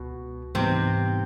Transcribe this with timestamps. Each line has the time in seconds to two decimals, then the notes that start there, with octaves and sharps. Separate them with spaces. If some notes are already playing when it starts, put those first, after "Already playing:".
Already playing: C#2 B2
0.55 G#2 C3 E3 G3 B3 C4 D#4